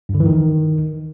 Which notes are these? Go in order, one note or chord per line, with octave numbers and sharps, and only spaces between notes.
G2
D3
E3
D#3